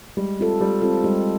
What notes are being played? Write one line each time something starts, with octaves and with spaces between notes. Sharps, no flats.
G3 G#3
C4 F4 A4
G3 G#3
C4 F4 A4
G3 G#3